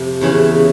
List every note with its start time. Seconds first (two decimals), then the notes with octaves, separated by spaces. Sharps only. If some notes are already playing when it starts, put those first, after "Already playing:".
Already playing: F2 C3
0.21 E2 C#3 E3